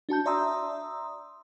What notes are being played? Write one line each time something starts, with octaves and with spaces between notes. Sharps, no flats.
D4 F#4 A5 G6
D5 E5 A#5 C6 D#6 E6